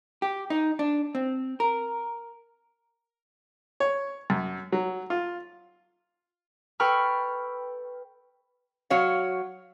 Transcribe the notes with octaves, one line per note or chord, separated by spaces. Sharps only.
G4
D#4
D4
C4
A#4
C#5
F#2
F#3
F4
A4 B4 G5 B5 C#6 F6
F#3 C#5 F5